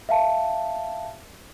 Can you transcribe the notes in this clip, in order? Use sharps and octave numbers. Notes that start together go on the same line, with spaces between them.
E5 F5 A5